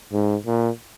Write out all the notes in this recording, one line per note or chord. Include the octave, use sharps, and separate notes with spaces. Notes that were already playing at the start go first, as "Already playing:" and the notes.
G#2
A#2